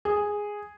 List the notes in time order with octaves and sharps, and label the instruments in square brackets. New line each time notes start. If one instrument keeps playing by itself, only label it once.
[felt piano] G#4